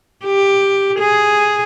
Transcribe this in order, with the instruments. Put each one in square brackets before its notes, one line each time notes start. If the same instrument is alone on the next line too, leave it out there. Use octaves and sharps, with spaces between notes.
[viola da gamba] G4
G#4